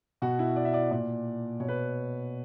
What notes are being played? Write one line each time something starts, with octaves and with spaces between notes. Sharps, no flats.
B2 F#4
E4
D5
E5
D5
E5
A#2 D5
B2 C#5
B4